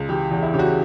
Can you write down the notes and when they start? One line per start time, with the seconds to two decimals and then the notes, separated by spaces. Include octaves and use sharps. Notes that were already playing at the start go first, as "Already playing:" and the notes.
Already playing: C#2
0.09 E3 G4
0.31 E2
0.42 E4
0.54 C#3 G4
0.59 F#4